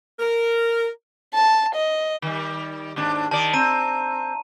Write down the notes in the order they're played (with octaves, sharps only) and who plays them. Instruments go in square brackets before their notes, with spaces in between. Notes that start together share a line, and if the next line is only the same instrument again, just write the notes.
[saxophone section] A#4
[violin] A5
D#5
[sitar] D#3 G3
D#2 G#2 D4
[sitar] D#3 D5 [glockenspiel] A5
[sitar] C4 [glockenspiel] A#5 D#7